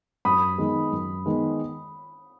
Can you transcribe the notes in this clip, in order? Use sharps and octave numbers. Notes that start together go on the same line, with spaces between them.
F#2 B5 D#6
D#3 G#3 B3
F#2
D#3 G#3 B3